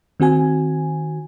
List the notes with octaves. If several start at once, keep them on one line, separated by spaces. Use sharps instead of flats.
D#3 C4 F#4 G#5